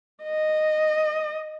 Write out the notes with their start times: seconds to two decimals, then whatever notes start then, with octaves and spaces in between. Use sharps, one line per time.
0.23 D#5